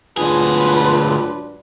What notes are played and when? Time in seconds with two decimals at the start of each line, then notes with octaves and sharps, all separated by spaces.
0.17 D2 G#2 F#3 D4 F4 G#4 B4